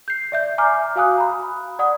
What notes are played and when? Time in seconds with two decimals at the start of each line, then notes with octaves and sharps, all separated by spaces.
0.08 G6 C7
0.32 D5 E5 G6
0.58 G#5 A#5 D6 F6
0.96 F#4 F5 G#5 D#6 F#6
1.18 A#5 B5
1.79 D5 F#5 D#6